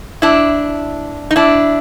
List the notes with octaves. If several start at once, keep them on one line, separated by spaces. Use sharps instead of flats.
D4 E4
D#4
D4 E4